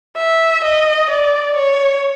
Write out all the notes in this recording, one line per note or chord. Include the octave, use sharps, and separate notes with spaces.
E5
D#5
D5
C#5